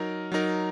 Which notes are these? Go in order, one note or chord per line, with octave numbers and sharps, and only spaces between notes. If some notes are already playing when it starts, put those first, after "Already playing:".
Already playing: F#3 D#4 A#4
F#3 D#4 A#4